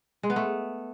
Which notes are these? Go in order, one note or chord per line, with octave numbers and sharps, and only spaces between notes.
G#3
B3
A3